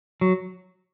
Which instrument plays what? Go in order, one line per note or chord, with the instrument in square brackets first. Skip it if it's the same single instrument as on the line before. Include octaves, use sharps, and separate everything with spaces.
[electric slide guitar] F#3